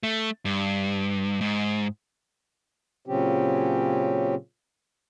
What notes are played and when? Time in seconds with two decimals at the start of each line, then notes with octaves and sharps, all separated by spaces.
0.03 A3
0.45 G2
1.41 G#2
3.06 A#2 C#3 F#3 C4 C#4 G4